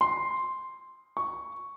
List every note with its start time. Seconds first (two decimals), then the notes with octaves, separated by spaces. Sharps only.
0.01 C6
1.17 C#6